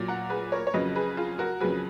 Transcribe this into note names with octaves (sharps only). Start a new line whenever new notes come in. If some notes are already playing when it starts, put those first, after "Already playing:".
Already playing: A#2 F#3
F#5 A#5
G#4 B4
A#4 C#5
C#5
F2 C#3 F#3 B4 D#5
G#4 B4
F4 G#4
F#4 A#4
F2 C#3 F#3 G#4 B4